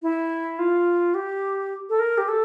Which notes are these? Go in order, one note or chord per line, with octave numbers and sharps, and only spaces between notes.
E4
F4
G4
A4
A#4
G4
A4